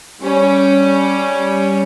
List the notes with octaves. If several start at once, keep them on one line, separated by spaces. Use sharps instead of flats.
G3 C#4